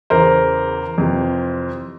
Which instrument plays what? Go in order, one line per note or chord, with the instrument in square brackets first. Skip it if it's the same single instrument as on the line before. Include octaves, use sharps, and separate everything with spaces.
[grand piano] E2 C#3 E3 A#4 C5
F2 C3 E3